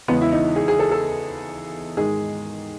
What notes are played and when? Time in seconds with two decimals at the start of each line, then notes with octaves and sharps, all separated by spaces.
0.08 E2 C#3 E3 G#3 B3
0.21 E4
0.32 D#4
0.56 G#4
0.68 G#4
0.79 A4
0.91 A4
1.97 G#2 D#3 G#3 G#4